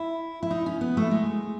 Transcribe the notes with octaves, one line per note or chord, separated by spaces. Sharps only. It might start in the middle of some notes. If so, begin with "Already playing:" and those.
Already playing: E4
E4
D#4
C#4
B3
A3
G#3